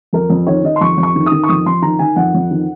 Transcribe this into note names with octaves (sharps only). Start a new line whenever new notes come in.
F2 A#4
F2
D#3 C#5
D#3 D#5
C6
F2 C#6
F2
C#6
D#3
D#6
D#3
C#6
F2 D#6
F2 C6
D#3 A#5
D#3 G#5
F2 F#5
F2
D#3